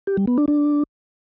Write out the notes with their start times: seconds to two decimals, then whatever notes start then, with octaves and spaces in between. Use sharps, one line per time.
0.07 G4
0.17 G3
0.27 B3
0.38 D4
0.48 D4